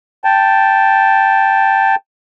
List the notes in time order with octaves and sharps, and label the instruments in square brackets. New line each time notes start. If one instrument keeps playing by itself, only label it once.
[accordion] G5 A5